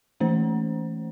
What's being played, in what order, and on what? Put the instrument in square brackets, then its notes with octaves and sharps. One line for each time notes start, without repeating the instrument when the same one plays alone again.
[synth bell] E3 A3 C#4 C5